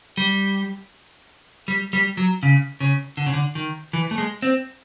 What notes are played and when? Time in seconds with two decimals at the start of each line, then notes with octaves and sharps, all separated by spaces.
0.17 G3
1.68 G3
1.93 G3
2.17 F#3
2.43 C#3
2.80 C#3
3.17 D3
3.26 C#3
3.33 D3
3.55 D#3
3.93 E3
4.11 A3
4.18 G#3
4.42 C4